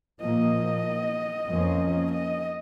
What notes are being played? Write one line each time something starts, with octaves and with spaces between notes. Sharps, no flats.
A#2 F3 A#3 D#5
F2 F3 A#3 C#4
D#5